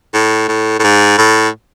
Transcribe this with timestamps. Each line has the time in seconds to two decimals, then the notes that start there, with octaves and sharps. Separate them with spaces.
0.14 A2
0.48 A2
0.79 A2
0.84 G#2
1.18 A2